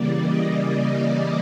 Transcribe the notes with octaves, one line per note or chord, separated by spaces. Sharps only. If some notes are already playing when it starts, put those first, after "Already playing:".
Already playing: C#3 E3 G3 A#3 D5
D#5
D#5